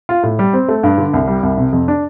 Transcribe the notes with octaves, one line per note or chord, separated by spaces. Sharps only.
F4
A2
G3
C4
A3
G2
D3
C2
G3
C2
C3
F2
D4